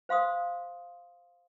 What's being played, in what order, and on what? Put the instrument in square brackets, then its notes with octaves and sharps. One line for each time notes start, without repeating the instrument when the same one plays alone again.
[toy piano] C5 F5 C6 D#6